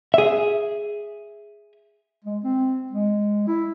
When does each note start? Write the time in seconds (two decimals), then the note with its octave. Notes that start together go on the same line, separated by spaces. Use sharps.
0.14 G#4 E5
2.25 G#3
2.44 C4
2.91 G#3
3.47 E4